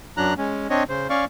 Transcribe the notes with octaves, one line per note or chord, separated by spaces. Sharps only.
F#2 F#3 D4 A#5 F#6
G#3 C#4
C4 D4 C#5 D#5
C#3 C5
C#4 D5 F5 C#6